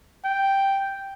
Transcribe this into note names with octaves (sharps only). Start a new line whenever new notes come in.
G5